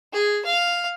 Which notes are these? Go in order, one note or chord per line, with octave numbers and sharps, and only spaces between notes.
G#4
F5